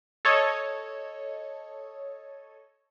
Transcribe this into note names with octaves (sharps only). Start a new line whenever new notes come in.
A4 C#5 D#5